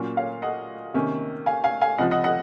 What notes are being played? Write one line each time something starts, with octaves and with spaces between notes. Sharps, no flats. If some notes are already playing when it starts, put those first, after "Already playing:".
Already playing: A#2 F#3 A#3 C#4
C#5 F5
D#5 F#5
C3 D#3 A#3 C#4
F5 G#5
F5 G#5
F5 G#5
C#2 C3 F3 D#5 F#5
D#5 F#5
D#5 F#5